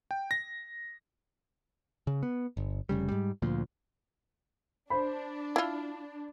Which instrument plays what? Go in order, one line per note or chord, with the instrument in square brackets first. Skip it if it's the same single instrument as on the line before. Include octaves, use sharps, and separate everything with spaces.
[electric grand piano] G5
A#6
[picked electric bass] C#3
B3
G1
F1 C#3 G3
G#2 G3
D2 A#2 F3
[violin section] D4 [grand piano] C5 B5
[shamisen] E4 F4